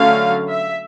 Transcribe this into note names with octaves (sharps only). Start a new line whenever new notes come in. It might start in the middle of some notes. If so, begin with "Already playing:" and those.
Already playing: D3 F#3 A3 C#4 F5
E5